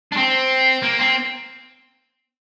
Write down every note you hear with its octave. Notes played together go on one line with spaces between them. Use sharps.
D4
C4
A#3
C4